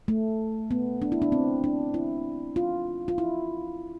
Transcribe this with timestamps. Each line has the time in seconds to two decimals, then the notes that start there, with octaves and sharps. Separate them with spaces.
0.08 A3
0.71 B3
1.02 D4
1.12 E4
1.22 D4
1.32 C4
1.64 D4
1.94 E4
2.56 F4
3.08 F4
3.18 E4